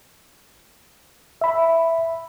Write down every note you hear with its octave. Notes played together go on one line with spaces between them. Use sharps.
E5 B5